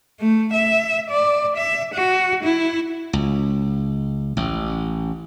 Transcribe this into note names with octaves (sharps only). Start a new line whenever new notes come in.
A3
E5
D5
E5
F#4
E4
C#2
A1